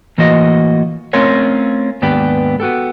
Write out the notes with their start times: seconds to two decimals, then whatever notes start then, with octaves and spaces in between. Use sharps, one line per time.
0.18 A2 E3 A#3 F4 F#4 D#5
1.13 A3 C4 C#4 F4 A#4 C#5
2.02 D#2 G#2 B3 D4 G4 B4
2.60 B3 F#4 G4 A4